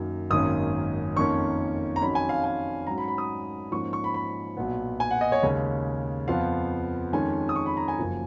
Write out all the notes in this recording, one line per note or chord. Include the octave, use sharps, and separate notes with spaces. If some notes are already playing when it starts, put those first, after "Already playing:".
Already playing: F#2 D#3 F#3 A#3
G#1 F#2 D#3 A#3 C#4 D#6
F2 D#3 A#3 C#4 C#6
A#5
F2 D#3 F#3 C#4 B5
G#5
F5
G#5
G#2 F#3 C#4 A#5
B5
B5
D#6
G#2 F3 A#3 C#4 C#6
C#6
B5
B5
B1 A#2 F#3 B3
G#5
F#5
D#5
C#5
D#2 C#3 G#3 C#4
F2 F3 B3 F5
F2 D#3 G#3 C#4 G#5
D#6
C#6
B5
A#5
G#5
F#1 F#2 F3 A#3